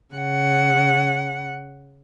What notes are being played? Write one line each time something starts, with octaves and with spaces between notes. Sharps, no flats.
C#3 F#5